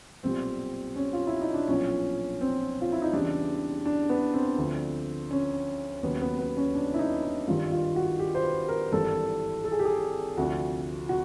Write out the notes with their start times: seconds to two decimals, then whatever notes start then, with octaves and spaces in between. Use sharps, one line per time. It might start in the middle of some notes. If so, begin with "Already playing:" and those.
0.23 B1 A#2 G3 C4
0.96 C#4
1.13 F4
1.27 E4
1.41 D#4
1.54 D4
1.68 B1 A#2 F3 C#4
2.41 C4
2.81 F4
2.92 E4
3.02 D#4
3.13 E2 C#3 E3 G3 D4
3.85 D4
4.10 B3
4.34 C4
4.58 D2 D3 F3
5.31 C#4
6.02 D#2 C#3 F#3 B3
6.21 B3
6.39 B3
6.57 C#4
6.75 D4
6.94 E4
6.99 D#4
7.23 E4
7.48 G#1 G2 D#3 G3 F4
7.72 F4
7.96 F#4
8.19 G4
8.35 C5
8.44 B4
8.68 A#4
8.92 G#1 G2 E3 G3 A4
9.64 A4
9.72 G#4
9.79 G4
9.85 G#4
10.37 D2 C3 F3 F#4
11.09 F#4